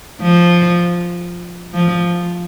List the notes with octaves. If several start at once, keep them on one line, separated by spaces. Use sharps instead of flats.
F3
F3